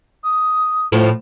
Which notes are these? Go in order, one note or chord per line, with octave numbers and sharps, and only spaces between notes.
D#6
A2 F3